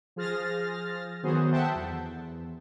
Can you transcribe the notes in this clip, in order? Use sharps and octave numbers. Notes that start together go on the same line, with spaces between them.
F3 G#4 C5 F6 A6 A#6
D#3 F#3 B3 F#4 G#4 C5
A4 C5 E5 F#5 G5 A5
E2